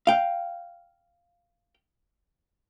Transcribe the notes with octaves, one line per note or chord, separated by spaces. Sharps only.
F5 G5